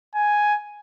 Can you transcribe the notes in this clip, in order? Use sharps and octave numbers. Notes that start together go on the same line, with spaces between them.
G#5